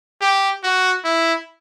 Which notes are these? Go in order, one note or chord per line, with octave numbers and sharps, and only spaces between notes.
G4
F#4
E4